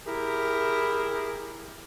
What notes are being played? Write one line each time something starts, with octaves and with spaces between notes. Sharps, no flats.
E4 G4 G#4 A#4